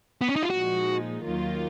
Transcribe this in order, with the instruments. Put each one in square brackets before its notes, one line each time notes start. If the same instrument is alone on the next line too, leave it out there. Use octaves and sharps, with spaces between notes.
[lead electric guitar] B3
C#4
D#4
F4
[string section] A#2 F3 G#3 D#4 [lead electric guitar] F#4
[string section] D#2 D#3 F#3 A#3 F4